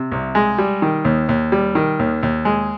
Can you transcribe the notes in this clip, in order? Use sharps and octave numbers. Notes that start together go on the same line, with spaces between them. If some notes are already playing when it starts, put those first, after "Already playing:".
Already playing: C3
C2
G#3
G3
D#3
D#2
D#2
G3
D#3
D#2
D#2
G#3